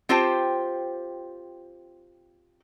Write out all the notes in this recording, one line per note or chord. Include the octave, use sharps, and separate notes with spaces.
C4 F4 G4 C5 G5 A5